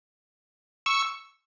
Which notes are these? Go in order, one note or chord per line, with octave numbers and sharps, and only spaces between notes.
C#6 E6